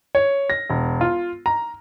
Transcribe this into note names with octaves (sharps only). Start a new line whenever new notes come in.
C#5
A#6
E1
F4
A#5